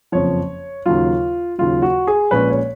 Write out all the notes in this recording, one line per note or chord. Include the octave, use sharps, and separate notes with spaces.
F#1 F2 F3 C#5
D#2 C#3 F#3 F4
D#2 C#3 F#3 F4
F#4
G#4
A#1 A#2 G#3 C#4 B4
C#5